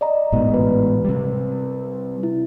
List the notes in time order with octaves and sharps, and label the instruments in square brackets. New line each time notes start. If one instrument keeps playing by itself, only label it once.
[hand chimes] D5 D#5 A#5
[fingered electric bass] A1 G#2 B2
[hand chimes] B4
[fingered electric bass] C3 G3
[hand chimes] E4